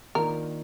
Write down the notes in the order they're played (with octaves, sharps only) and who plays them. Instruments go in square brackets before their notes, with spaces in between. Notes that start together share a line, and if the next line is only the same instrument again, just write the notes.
[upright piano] D#3 A#3 D4 F4 [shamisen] A#4